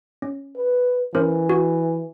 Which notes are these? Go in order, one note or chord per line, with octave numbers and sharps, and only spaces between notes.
C#4
B4
E3 C#4 A#4 C5
F#4